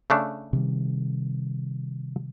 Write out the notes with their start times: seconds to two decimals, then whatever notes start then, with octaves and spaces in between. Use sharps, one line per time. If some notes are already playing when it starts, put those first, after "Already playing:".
0.10 C#3 A3 D4
0.53 C3 D#3 G3